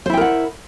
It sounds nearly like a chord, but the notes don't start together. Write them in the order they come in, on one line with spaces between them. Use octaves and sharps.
C5 E4 G5 A#4 F#5